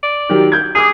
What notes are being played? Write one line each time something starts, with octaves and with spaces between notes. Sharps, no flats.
D5
D#3 F#3 G4
G6 G#6
G#4 D6 D#6